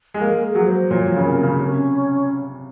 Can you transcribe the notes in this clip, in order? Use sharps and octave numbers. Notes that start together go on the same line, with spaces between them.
G#3
A#3 A#4
G#4
F#3
C5
A#2 C#5
A#2
C#3
C3 A#4
C#3
C3 C#4